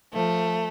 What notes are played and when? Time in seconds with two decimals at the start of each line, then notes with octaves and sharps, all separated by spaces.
0.13 F3 A3